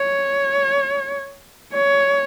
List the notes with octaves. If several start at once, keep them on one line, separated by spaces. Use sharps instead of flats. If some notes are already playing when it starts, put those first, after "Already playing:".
Already playing: C#5
C#5